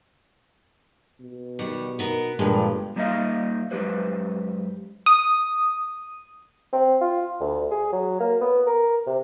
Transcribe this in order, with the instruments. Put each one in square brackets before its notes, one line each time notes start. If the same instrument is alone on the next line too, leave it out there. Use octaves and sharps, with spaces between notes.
[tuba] B2
[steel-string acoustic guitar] D#3 G3 F#5
B3 D#4 A#4
[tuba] G1 [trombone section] G2 [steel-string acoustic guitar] A#2 F3 [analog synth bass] G#3
[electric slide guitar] G3 A#3 D#4 D#5 F5
F#2 G#3 G4 B4 C5
[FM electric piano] D#6
[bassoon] C4
F4
D2
G#4
F#3
A#3
B3
A#4
C3